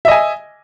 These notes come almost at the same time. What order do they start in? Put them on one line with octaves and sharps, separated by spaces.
E5 D#5 G#5